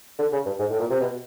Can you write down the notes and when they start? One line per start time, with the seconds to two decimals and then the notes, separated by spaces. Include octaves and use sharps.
0.19 D3
0.32 C#3
0.46 G2
0.59 G#2
0.70 A2
0.80 A#2
0.90 C3
1.00 B2